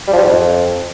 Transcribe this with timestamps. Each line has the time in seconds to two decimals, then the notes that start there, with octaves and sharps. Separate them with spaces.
0.08 G3
0.13 F3
0.18 G3
0.24 G#2
0.29 F2